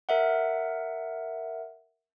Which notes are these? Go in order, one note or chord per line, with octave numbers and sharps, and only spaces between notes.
A#4 E5 F#5